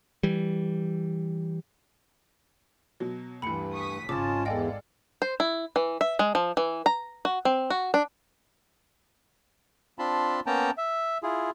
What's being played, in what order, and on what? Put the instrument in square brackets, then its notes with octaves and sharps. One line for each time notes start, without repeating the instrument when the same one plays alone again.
[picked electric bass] E3 G3
[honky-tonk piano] B2 F#3
[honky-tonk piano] D2 E3 [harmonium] G2 [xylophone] B5 C#7
[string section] C#6 D#6 B6
[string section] G#1 G#3 [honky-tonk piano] C#3 A6 [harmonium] C#4 F4 A5 [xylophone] D6
[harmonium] E2 [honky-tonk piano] A4 D5 F5 [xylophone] D#5 G5 G#5
[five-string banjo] C5
E4
E3
E5
G#3
F3
E3
A#5
F#4
C4
F#4
D4
[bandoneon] C4 D4 F4 A5 B5 C6
A#3 B3 C#4 G5 A5 A#5
E5
E4 F4 G#4